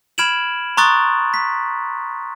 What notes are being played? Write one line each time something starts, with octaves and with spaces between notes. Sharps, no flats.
B5 F6 G#6 D7 E7 F#7
A#5 C6 C#6 D#6 F#6 A6
B6